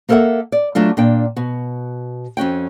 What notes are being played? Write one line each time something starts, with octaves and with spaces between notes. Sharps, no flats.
A#3 A4 A#4 C5 E5 F#5
D5
F#3 A3 D4 F4
A#2 D4 G5
B2 F#4
F2 C#4 F#4 G5